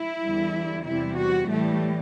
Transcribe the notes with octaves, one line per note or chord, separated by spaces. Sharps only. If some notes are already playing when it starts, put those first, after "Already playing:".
Already playing: E4
E2 D3 G3
E2 C3 G3 E4
F#4
A2 E3 G3 A3